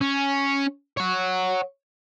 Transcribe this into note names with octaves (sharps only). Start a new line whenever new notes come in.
C#4
C#5 F#5